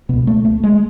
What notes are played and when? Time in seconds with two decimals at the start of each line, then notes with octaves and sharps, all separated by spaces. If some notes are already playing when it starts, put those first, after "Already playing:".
0.09 C#2 B2 B3
0.27 A3
0.45 A3
0.64 G#3